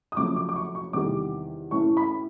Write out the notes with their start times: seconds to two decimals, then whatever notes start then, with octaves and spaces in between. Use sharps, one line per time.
0.12 D#6
0.16 F#2 C#3 F3 A3 D6
0.36 D6
0.49 D6
0.56 C#6
0.75 C#6
0.93 E2 C3 D#3 G3 D6
1.71 A2 E3 A3 C#4 C#6
1.97 B5